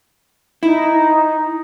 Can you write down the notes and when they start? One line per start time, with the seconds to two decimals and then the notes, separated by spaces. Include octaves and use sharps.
0.63 D#4 E4